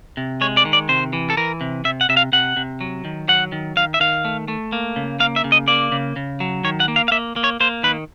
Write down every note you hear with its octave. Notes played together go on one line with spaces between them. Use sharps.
C3
G#3 C#5
D5
D#3
D5
C3 C5
E3
A4
E3 A#4
C3
C3 E5
F#5
C3 E5
F5
C3 F#5
C3
F#3
D#3
F#3 F#5
D#3
D#3 F5
E5
D#3 F5
A3
A3
A#3
C#3
A#3 F5
E5
C#3
D#5
A#3 D5
C#3
C#3
F#3
D#3 C#5
F#5
A#3
F5
F5
A#3 E5
A#3
C#5
A#3 C5
D#3 B4